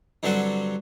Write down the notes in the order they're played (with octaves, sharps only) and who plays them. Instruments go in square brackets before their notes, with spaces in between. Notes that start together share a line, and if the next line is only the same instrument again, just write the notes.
[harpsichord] G2 D3 F#3 C4 F#4